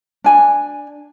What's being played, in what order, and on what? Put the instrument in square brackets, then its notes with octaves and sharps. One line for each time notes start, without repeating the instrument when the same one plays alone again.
[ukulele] D4 G#5